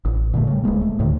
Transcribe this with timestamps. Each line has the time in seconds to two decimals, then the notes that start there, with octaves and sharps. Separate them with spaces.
0.05 A1
0.33 A#2 D3 F#3 A3
0.47 C#3 G3
0.64 D1 G#1 G#3 A#3
0.81 A3
0.99 D2 A2 D3 D#3